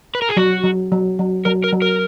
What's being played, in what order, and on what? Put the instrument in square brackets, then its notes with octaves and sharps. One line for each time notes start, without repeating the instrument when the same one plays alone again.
[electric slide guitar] B4
A#4
G#4
[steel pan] F#3 [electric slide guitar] F#4
[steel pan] F#3
F#3
F#3
[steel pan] F#3 [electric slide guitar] A#4
[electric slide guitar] A#4
[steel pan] F#3
[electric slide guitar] A#4